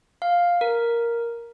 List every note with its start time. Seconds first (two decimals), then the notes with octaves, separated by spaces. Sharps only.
0.22 F5
0.61 A#4